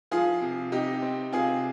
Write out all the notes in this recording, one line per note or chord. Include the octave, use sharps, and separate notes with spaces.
F3 F4 G#4
C3
C3 D#4 G4
C4
C3 F4 G#4